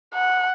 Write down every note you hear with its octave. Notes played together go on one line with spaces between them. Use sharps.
F#5